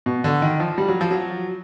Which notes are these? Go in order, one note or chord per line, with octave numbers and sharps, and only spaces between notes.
B2
D3
D#3
F3
G3
F#3
F3
F#3